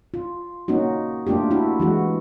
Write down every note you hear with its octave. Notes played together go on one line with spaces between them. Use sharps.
F4
A#3 C#4 D#4 F#4
A3 A#3 D4 F4 G4
D4 E4 F#4
E3 G#3 F#4